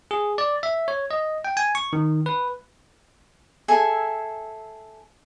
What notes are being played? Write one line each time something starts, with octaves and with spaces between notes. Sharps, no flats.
G#4
D5
E5
C#5
D#5
G5
G#5
C#6
D#3
B4
G#4 A4 E5 G#5